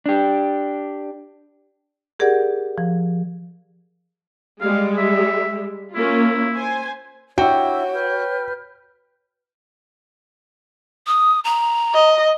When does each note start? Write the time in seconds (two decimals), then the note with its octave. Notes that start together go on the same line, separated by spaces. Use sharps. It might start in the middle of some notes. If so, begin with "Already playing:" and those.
0.06 D4 G4
2.19 G4 G#4 A#4 D5 F#5
2.78 F3
4.61 G3 G#3 F5
4.97 E5
5.95 A#3 C#4 E4 F4
6.56 C5 G#5
7.38 D4 E4 F#4 C#5 G5
7.93 B4 F6 G6
11.07 D#6
11.44 A#5
11.93 D#5